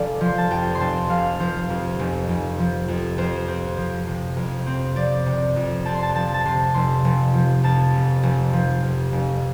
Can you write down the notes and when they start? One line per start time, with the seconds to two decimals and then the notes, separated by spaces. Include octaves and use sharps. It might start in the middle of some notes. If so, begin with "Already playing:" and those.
Already playing: F1 A4 D5 F5
0.21 F3 C6
0.38 A5
0.51 F2 G5
0.75 C6
0.80 F1 A5
1.09 F1 F5
1.40 F3 C5
1.69 F2
1.99 F1
2.29 F1
2.59 F3
2.88 F2
3.18 F2 C5
3.48 C4
3.77 F3
4.07 C3
4.37 F2
4.67 C4
4.96 F3 D5
5.26 C3
5.56 F2
5.85 C4 A5
5.94 C6
6.02 A5
6.15 F3 A5
6.34 A5
6.45 C3 C6
6.74 F1 C6
7.05 F1
7.34 F3
7.63 F2 A5
7.94 F1
8.23 F1
8.53 F3
8.83 F2
9.13 F1